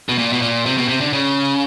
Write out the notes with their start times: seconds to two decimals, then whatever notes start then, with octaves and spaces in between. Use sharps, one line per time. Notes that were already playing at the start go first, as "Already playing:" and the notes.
0.09 B2
0.18 A#2
0.33 B2
0.42 A#2
0.66 C3
0.78 B2
0.88 C3
1.00 D3
1.13 C#3